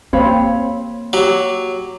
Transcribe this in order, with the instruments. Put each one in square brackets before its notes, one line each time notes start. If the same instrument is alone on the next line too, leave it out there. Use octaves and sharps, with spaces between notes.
[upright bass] A#3 [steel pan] C4 [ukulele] C#5 F5 B5
[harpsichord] F#3 [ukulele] G4